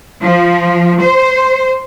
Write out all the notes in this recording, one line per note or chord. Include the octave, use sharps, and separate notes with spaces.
F3
C5